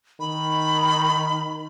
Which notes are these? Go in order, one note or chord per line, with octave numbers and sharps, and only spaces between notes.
D#3 B5